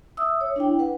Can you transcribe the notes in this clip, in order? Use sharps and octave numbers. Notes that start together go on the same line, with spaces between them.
E5 D#6 E6
C#5
D4 E4 G5
B4 F#5